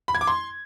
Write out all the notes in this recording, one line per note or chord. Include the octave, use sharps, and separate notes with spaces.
B5
G#6
D6
C6